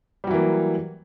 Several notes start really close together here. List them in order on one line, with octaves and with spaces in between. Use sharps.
G3 F#3 E3 A#3